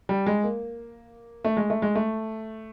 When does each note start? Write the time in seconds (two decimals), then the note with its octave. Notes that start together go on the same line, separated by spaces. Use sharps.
0.09 G3
0.26 G#3
0.44 A#3
1.44 A3
1.57 G#3
1.70 A3
1.82 G#3
1.95 A3